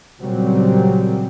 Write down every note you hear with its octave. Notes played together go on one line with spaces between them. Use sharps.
A#2 C#3 F#3 G3 C4